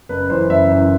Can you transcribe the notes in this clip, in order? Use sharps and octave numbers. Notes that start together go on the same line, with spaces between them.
F#1 B4
F#2 E3 C5
F#1 E5
F#2 E3